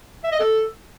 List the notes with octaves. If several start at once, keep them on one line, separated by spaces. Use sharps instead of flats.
E5
D#5
A4